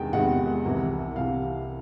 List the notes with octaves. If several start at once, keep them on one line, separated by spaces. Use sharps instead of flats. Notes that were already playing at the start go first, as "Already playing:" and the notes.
Already playing: E2 C3 D#3 G#3 B3 G5
E2 C3 D#3 G#3 B3 F#5
C2 C3 E3
C2 C3 E3 F5